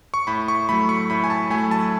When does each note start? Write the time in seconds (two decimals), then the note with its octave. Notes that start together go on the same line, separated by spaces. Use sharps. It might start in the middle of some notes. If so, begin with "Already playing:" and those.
0.14 C#6
0.27 A2 B5
0.48 C#6
0.69 F#3 A3 B5
0.89 C#6
1.10 A2 B5
1.24 G#5
1.30 A5
1.50 A3 G#5
1.54 F#3
1.71 A5